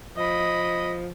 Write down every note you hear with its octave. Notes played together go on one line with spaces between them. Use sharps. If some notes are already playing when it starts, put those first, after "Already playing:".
F3 D#5 B5